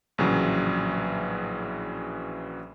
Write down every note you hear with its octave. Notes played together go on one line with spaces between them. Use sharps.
A#1 A2 C#3 E3 F#3